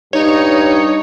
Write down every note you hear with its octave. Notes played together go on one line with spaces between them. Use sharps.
G2 D#4 C#5